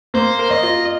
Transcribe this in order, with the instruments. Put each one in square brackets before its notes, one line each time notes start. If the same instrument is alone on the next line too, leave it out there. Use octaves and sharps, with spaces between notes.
[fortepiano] A#3 [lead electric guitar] C5
[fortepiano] A#4
[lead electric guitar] D#5
[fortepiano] F4